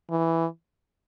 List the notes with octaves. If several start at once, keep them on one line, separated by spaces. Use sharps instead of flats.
E3